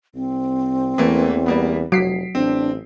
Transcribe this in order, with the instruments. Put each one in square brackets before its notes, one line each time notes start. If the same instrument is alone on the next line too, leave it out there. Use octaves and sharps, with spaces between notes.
[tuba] C2 [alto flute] C4
[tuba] E2 [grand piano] E3 A3 A#3
[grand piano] G3 A#3 B3
[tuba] F1 [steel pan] F#3 [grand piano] B6 C7 D7
[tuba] A1 [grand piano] C4 [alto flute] D4